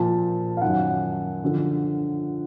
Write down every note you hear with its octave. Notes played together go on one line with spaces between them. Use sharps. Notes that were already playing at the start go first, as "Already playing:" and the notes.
Already playing: A#2 F3 A5
F5
F#2 D#3 F#5
D3 F3